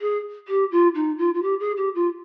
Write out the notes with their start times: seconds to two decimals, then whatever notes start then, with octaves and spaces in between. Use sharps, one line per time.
0.01 G#4
0.48 G4
0.71 F4
0.95 D#4
1.18 F4
1.34 F4
1.42 G4
1.60 G#4
1.77 G4
1.95 F4